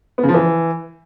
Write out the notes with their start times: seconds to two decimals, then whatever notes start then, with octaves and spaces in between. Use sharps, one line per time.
0.18 B3
0.23 C#3
0.29 F3
0.34 E3